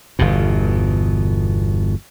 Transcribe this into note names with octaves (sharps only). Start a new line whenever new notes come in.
G1 E2 B2